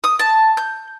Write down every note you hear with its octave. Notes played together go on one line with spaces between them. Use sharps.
D#6
A5
G6